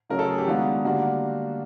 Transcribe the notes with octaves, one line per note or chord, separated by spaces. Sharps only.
C#3 F#3 A3 C#4 A#4
A4
G#4
G4
D#3 G#3 B3 D4 F4 F#4
D3 G3 A#3 D4 F4 F#4